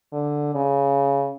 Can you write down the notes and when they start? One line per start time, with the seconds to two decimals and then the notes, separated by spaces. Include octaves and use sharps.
0.13 D3
0.55 C#3